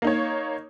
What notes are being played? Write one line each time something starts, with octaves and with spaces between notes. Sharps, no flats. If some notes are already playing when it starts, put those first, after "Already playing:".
A#3 D#4 C#5